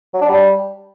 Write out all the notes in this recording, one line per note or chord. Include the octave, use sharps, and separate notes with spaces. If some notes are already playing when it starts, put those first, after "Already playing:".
F#3
D4
G3